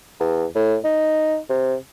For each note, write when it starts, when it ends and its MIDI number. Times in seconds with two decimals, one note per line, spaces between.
0.20 0.45 40
0.56 0.77 45
0.85 1.38 63
1.50 1.75 48